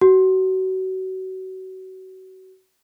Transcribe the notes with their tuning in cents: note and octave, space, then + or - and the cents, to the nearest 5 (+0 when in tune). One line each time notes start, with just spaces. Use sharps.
F#4 +30